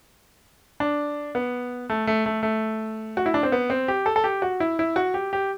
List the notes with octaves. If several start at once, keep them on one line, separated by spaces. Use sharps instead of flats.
D4
B3
A3
A3
A3
A3
F#4
E4
D4
C4
B3
C4
G4
A4
A4
G4
F#4
E4
E4
F#4
G4
G4